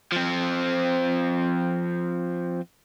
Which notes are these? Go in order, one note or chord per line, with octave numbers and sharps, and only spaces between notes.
F3 C4